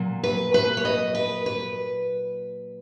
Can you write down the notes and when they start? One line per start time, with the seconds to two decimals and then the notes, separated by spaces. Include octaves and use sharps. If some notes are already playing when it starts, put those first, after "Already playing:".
Already playing: A#2 F#3
0.24 B4
0.54 B4
0.77 C#5
0.85 D#5
1.15 B4
1.46 B4